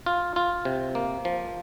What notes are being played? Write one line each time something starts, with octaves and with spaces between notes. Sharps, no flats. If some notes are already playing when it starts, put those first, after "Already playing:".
F4
F4
C3
A#3
F3